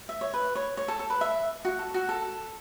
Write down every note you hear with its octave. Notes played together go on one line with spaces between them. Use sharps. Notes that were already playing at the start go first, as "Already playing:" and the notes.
E5
C#5
B4
C#5
C#5
A4
A4
B4
E5
F#4
A4
F#4
A4